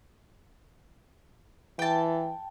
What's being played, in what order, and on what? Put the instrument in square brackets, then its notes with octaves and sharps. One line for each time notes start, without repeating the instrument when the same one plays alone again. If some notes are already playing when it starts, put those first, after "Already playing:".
[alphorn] E3 [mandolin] G5 A5